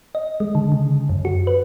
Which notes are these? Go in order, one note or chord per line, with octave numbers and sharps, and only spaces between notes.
D#5
G#3
D3
C#3
F#2
F#4
B4